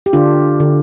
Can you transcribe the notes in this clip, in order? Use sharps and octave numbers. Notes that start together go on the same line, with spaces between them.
G4
D3 D4 F4
D3